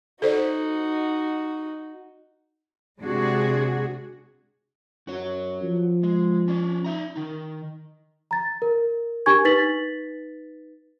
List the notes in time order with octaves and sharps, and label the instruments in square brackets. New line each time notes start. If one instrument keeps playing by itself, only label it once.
[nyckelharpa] D#4 F#4 [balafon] A4 C5 D5
[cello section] C3 G#3 D4 F#4 G#4
[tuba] F#2 [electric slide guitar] F#4 C#5
[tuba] F3
[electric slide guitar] G#3
C#4 D4
D#4 E5 A#5
D#3 D#4
[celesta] A#5 A6
A#4
D4 G4 A#4 G#5 C#6 G#6
D#4 B4 A6 B6 F#7